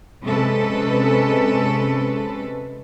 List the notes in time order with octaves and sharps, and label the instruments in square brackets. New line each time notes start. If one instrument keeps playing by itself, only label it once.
[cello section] C3 G#3 C#4 A4 B4